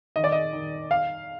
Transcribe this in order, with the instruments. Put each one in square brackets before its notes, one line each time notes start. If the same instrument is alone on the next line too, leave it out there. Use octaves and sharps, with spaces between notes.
[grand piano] D#3 D#5
D5
D#5
D#3
F5